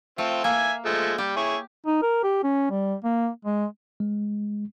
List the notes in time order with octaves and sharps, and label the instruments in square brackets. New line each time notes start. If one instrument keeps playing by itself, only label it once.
[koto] A3 [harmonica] C4 F4
[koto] A#3 [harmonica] E5 G#5
[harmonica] F3 G#3 A3
[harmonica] G3 [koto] G4
[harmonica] E4 G#4 C#5
[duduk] D#4
A#4
G4
C#4
G3
A#3
G#3
[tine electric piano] G#3